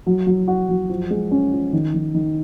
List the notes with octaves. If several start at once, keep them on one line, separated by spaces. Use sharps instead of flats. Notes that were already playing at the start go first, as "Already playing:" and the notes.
F#3
F#3
F#4
F#3
F3
G#3
C#4
F3
D#3
D#3
D#3